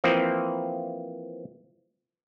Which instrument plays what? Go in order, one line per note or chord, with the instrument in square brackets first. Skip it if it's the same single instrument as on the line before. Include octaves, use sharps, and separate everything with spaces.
[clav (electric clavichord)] E3 F3 A#3 C4